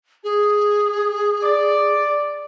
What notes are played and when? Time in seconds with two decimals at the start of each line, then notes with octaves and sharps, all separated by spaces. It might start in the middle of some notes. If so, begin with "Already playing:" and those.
0.23 G#4
1.43 D5